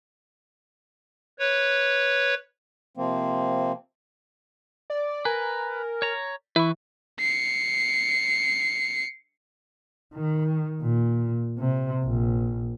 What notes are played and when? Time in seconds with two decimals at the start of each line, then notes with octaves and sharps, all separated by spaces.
1.39 B4 C#5
2.97 C3 F3 A#3 C4
4.90 D5
5.25 A#4 B4 G#5
6.02 C#5 A#5
6.56 E3 E4 B4 C#6
7.20 C7 C#7
10.14 D#3
10.82 A#2
11.59 C3
12.04 A#1